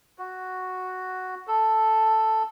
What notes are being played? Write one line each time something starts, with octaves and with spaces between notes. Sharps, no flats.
F#4
A4